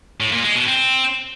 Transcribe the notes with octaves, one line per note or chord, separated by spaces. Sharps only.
A2
A#2
G#3
B2
C4